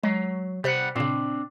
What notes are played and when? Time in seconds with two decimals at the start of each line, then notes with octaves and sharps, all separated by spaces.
0.03 F#3 G#3
0.64 C3 G3 C5 F#5 F#6
0.96 A#2 C#3 C4 D4